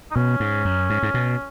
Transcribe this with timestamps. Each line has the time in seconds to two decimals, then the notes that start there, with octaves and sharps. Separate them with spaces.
0.11 D#4
0.16 B2 C#4
0.40 G#2
0.65 F#2
0.90 G#2
1.03 G#2
1.14 B2